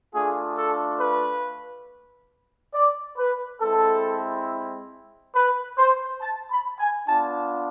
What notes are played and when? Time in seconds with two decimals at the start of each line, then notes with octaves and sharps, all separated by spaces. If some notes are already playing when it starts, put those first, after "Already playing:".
0.13 A3 D4 F4 G#4
0.57 A4
1.00 B4
2.74 D5
3.18 B4
3.61 G#3 C4 E4 A4
5.34 B4
5.78 C5
6.21 A5
6.50 B5
6.79 G#5
7.08 B3 D4 F4 A5